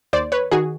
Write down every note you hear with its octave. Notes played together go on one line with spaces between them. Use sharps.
D#2 C5 D5
B4 C#5
D#3 F#4 G#4